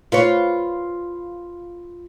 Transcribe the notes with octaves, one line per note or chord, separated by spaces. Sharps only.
F4 B4 C#5